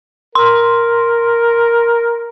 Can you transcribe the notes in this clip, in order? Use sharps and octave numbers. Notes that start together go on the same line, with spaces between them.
A#4 C6